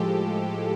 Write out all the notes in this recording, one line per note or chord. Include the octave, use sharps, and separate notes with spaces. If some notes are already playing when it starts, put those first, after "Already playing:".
Already playing: A2 F3 G#3 G4 A4